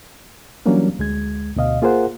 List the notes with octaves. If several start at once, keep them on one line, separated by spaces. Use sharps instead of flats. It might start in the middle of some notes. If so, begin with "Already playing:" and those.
E3 F#3 G3 A#3 C#4 D4
D2 G#3 G#6
D2 B2 D#5 F5
A#3 F4 G#4 A#4 C5 F#5